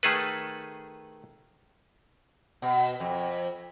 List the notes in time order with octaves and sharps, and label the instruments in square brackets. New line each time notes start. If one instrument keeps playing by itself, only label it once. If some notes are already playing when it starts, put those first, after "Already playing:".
[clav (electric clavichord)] D#3 A3 G#4 A4 B4
[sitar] B2
F2